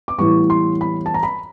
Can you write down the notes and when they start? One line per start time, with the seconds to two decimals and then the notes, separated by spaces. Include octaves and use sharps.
0.08 D6
0.18 A2 E3 G3 B3 C#6
0.50 C6
0.81 B5
1.06 A5
1.14 A#5
1.23 B5